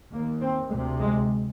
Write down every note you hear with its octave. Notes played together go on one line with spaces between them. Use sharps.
D#2 A#3
C4
D2 C3 G#3
G#3